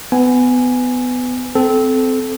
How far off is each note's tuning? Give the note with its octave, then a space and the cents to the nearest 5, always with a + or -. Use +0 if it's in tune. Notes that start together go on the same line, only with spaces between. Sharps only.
B3 +20 G#5 +0
C4 -20 A4 -20